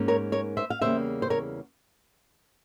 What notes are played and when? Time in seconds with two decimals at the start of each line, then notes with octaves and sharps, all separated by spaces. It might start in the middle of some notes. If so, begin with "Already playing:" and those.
Already playing: G#2 A#3 C#4
0.08 A#4 C#5
0.32 A#4 C#5
0.57 C5 E5
0.70 F5
0.81 E2 C#3 G3 A#3 C5 E5
1.22 C5
1.30 A#4 C#5